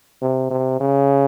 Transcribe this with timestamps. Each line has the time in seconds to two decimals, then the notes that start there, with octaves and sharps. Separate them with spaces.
0.22 C3
0.50 C3
0.80 C#3